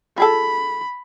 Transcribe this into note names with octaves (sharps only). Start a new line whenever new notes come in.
F4 G#4 A4 B5